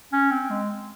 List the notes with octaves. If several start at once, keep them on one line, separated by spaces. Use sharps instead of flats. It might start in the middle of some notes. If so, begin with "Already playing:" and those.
C#4
C4
G#3